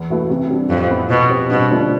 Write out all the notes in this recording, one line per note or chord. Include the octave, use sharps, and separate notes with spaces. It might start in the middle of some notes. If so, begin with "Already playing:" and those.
Already playing: E2
B2 A3 E4 B4
C3
G3 D4
F2 A2
F3 B3 E4
B2 F3
C4 G4
G2 B2
D3 F3 A3 D4